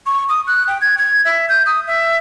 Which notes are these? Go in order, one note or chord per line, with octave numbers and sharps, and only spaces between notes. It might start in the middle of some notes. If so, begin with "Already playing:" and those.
C#6
D#6
F#6
G5
G#6
G#6
E5
G6
D#6
E5